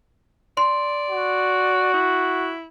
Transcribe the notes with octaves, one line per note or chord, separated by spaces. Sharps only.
D5 C6
F#4
E4